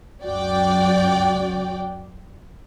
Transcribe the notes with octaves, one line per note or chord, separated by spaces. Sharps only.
C#2 F#2 F#4 D5 G5